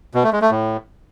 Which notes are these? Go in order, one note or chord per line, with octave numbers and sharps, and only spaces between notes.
B2
A3
G#3
A3
A2